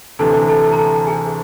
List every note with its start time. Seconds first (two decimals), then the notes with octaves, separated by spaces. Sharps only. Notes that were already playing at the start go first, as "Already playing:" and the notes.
0.19 D2 C3 E3 A4 A5
0.48 A4 A5
0.72 A#5
0.78 A4 A5
1.07 G#4 G#5